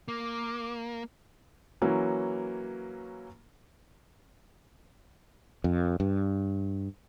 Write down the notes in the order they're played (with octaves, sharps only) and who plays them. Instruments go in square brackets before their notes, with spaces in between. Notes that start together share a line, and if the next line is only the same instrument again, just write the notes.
[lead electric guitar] A#3 [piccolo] D6
[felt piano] E3 F#3 A#3 C#4
[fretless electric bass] F2
G2